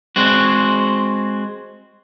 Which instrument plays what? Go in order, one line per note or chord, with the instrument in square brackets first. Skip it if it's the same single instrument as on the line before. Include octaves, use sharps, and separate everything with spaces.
[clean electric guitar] G#3 C4 F#4